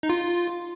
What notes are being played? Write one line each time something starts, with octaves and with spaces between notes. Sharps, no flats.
D#4
F4